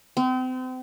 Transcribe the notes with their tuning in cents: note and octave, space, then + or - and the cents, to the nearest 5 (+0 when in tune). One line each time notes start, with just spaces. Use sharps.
C4 -35